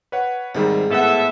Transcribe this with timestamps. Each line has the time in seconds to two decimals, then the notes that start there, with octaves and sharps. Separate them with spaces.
0.12 B4 C#5 F#5
0.55 G#2 C3 D#3 G3
0.90 A2 B3 A4 E5 F#5